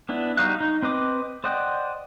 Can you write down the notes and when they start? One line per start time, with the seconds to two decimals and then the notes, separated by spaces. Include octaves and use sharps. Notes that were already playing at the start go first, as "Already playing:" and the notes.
0.09 B3 D4 E4
0.37 G3 D#4 F#4 F5 F#6
0.61 D#4
0.82 C4 B4 D#5 D6
1.44 C5 D5 D#5 F#5 G5